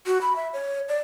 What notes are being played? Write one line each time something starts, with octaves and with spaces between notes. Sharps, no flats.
F#4
B5
E5
C#5
D5